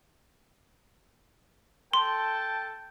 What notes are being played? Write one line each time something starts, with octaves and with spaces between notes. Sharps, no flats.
A4 G5 A5 C6